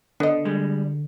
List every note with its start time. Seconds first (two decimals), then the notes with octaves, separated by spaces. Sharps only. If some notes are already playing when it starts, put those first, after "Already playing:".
0.20 D3 B3 D#5
0.45 G3 G#3